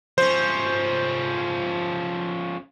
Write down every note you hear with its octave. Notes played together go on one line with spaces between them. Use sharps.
F3 C#4 C5